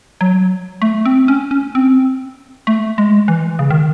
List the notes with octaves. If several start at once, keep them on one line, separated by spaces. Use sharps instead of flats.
F#3
A3
C4
C#4
C#4
C4
A3
G#3
E3
C#3
D#3